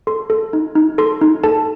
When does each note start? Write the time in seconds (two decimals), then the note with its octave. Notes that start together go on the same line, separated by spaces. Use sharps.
0.07 A4 C6
0.30 A4
0.53 D#4
0.76 D#4
0.98 A4 C6
1.21 D#4
1.44 A4 A5